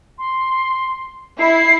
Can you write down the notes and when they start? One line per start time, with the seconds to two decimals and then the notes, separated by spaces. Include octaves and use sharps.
0.18 C6
1.40 E4 C7